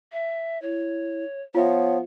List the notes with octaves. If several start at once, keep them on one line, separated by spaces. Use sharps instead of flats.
E5
E4 C#5
F3 B3 F4 C#5 E5